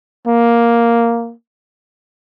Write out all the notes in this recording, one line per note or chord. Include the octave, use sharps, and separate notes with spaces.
A#3